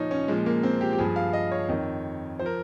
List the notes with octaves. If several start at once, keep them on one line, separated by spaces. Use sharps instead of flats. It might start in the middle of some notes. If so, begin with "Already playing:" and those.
Already playing: A#2 F3 D#4 C#5
C#4
A#2 F3 G#3
A#3
C4
G4
G4
G2 F3 G#4
F5
D#5
C#5
F2 D#3
F3 C5
A#4